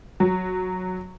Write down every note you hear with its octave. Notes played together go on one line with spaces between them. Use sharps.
F#3